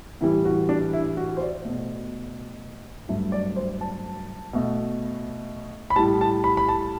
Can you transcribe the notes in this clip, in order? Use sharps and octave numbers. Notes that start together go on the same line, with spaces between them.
A2 E3 G3 E4
F#4
D4
E4
F#4
C5
D5
B2 A3
G2 F#3 A3 E5
D5
C5
A5
B2 A3
B5
A2 G3 A5
A5
B5
B5
A5